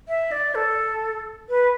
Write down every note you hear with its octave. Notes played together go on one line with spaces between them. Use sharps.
E5
D5
A4
B4